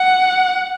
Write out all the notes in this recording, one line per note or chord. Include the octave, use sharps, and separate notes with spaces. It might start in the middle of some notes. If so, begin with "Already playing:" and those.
Already playing: F#5